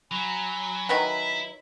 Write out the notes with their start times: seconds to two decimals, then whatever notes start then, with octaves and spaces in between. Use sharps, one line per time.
0.11 F#3 G#5 A#5 B5
0.89 D#3 F#3 E4 B4 B6